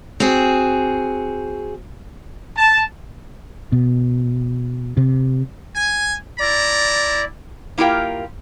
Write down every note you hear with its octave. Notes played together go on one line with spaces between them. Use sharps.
C4 F#4 G#4
A5
B2
C3
G#5
E4 D5 A5 A#5
A#3 E4 F4 G4 A#4 G5